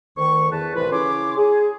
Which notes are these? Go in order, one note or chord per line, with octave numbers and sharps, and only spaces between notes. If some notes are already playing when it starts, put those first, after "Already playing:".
D2 D#3 C#6
E2 B4 A5
C2 A2 E3 F4 B4
C#3 C#4 E4 C#5 C6 D6
G#4